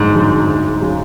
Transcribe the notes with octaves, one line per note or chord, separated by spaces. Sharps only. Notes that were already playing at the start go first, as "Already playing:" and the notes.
Already playing: G1 F2 G#2 D3 F#3
F2 D3 F#3
D2
C#3 F#3